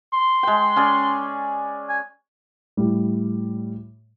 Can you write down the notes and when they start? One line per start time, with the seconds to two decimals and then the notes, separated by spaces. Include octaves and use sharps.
0.13 C6
0.43 G#3 G5
0.76 C#4 G#4 D5
1.89 G#5
2.77 A2 G3